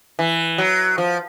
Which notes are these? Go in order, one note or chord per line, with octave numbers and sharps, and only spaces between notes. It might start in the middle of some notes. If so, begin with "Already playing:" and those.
E3
F#3
F3